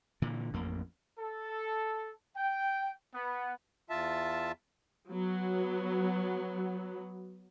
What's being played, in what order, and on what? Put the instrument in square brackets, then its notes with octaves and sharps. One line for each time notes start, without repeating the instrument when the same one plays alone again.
[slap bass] A#2 D3 E3
A1 F2 A#3
[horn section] A4
G5
B3
[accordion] E2 F4 E5 A5
[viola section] F#3 B3